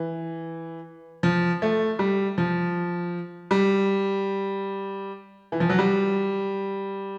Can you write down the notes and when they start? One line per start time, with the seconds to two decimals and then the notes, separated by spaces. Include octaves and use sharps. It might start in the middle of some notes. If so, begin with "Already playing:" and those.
Already playing: E3
1.23 F3
1.62 A3
1.99 G3
2.38 F3
3.51 G3
5.52 E3
5.60 F3
5.70 F#3
5.79 G3